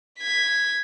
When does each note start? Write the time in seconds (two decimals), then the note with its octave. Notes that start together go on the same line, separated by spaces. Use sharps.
0.20 G#6 B6